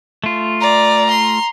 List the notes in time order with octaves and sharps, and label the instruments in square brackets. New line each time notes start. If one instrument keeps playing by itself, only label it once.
[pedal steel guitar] A3 F4
[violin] D5 [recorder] A#5
[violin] C6